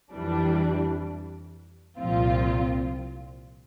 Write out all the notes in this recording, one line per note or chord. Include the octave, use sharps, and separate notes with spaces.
F2 E3 G3 D4
C2 A#2 F3 C4 F4